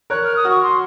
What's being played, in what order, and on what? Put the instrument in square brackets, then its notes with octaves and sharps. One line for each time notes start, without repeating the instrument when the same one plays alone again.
[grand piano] A#4 C#5 [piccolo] F#6
[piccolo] F6
D#6
[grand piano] F#4 [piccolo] C#6
[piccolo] C6